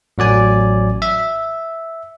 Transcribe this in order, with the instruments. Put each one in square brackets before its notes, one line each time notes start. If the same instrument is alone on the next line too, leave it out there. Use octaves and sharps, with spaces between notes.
[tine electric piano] A1 F#3 D5 G#5
E5